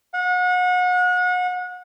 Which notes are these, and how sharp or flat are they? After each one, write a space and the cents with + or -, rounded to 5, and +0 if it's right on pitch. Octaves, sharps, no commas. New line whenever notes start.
F#5 -35